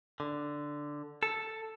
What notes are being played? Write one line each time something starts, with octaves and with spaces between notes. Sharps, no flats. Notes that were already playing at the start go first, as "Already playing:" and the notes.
D3
A4